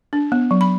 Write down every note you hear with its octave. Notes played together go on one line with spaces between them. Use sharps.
D4
B3
F#3
B5